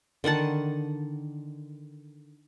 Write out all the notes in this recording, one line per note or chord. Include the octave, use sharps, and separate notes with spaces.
D3 D#3 F#5 A5